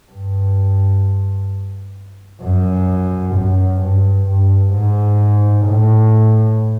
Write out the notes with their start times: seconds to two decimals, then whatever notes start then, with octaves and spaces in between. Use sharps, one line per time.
0.11 G2
2.42 F#2
3.35 F#2
3.81 G2
4.27 G2
4.73 G#2
5.66 A2